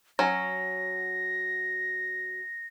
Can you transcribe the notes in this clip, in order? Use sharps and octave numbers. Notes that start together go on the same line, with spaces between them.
F#3 C#4 A#6